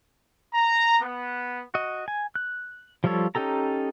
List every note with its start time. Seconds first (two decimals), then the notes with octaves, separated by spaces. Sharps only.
0.54 A#5
1.02 B3
1.74 F#4 D#5
2.08 G#5
2.35 F#6
3.04 F3 G3 F4 A4 C#5
3.35 C#4 D#4 G4 A4 A#5